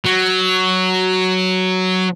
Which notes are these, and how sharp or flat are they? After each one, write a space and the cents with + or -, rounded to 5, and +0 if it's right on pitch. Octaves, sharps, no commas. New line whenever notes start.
F#3 +5